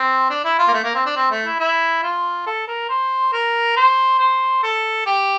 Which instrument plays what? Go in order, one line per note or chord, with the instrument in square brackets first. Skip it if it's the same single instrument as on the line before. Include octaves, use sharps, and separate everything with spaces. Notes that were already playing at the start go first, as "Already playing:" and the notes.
Already playing: [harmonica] C4
D4
E4
F4
A#3
A3
A#3
C4
D4
C4
A3
E4
E4
F4
A4
A#4
C5
A#4
C5
C5
A4
G4